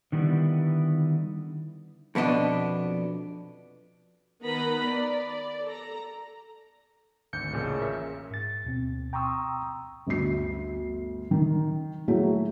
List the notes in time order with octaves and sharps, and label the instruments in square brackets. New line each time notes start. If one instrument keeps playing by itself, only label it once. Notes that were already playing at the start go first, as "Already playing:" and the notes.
[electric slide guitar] D3 D#3 G3 B3 E4
[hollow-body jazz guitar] F2 B2 B3 D4 D#5
[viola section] D#3 B3 B4 A#5 B5
D5
A4 A#5
[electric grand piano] G#1 D2 G6 [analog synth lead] C#7
[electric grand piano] A1 A#2 [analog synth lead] C#3
[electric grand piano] A#4 E5
[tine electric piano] G#2 A6
D2 B2 C4
G5 A#5 C6 C#6 D#6 E6
[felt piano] G1 D2 C7
D#3
F#3 A3 E4 F#4 G#4